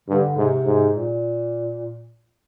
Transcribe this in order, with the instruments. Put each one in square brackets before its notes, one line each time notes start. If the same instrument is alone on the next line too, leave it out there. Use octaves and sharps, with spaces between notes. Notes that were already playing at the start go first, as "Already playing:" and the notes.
[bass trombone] G2 [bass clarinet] D3
[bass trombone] G#2 [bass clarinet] C3
[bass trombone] G#2
[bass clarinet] A#2